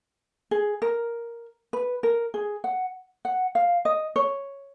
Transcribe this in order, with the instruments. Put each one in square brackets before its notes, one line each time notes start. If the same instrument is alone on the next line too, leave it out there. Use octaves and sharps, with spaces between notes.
[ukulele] G#4
A#4
B4
A#4
G#4
F#5
F#5
F5
D#5
C#5